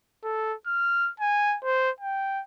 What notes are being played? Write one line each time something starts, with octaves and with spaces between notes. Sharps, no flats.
A4
F6
G#5
C5
G5